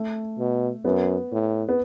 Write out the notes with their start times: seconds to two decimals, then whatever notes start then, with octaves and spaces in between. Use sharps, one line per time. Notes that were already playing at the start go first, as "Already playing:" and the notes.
Already playing: A3
0.38 B2
0.84 F#2 B3
1.32 A2
1.69 B3